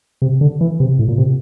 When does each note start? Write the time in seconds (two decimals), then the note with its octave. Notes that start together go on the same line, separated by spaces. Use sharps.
0.22 C3
0.41 D3
0.61 E3
0.80 C3
0.99 A2
1.08 A#2
1.18 C3